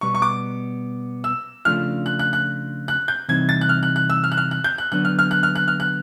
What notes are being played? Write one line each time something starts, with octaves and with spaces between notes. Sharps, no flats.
B2 G3 B3 C#6
C#6
D6
E6
C#3 F3 A3 D4 F4 F6
F#6
F#6
F#6
F#6
G6
C3 E3 G3 C4 D#4 G#6
A6
F#6
F6
F#6
F#6
E6
F6
F#6
F6
F#6
G6
F#6
D3 F#3 B3 D4 F#6
F6
F6
F#6
F6
F#6
F6
F#6